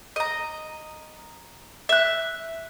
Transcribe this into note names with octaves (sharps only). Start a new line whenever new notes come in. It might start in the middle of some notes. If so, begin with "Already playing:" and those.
D#5 A#5
E5 F#6